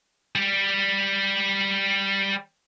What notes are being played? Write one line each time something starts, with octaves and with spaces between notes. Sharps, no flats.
G3 G4